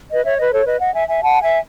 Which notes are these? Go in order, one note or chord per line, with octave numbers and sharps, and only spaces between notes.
B4 D#5
C#5 E5
B4 D#5
A4 C#5
B4 D#5
D#5 F#5
E5 G#5
E5 G#5
F#5 A5
E5 G#5